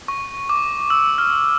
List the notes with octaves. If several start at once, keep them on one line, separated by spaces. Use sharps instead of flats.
C#6
D6
E6
F6